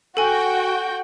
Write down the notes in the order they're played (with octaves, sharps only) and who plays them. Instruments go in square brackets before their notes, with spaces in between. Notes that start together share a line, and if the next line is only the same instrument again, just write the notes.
[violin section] F#4 G5 [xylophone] A4 G#5